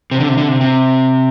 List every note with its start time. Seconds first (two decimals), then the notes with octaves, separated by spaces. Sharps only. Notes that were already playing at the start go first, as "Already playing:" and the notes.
0.11 C3
0.20 D3
0.29 C3
0.38 D3
0.48 C3
0.61 C3